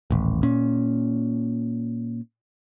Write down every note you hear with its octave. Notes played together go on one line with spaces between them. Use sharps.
D#1 A1
A#2 C#4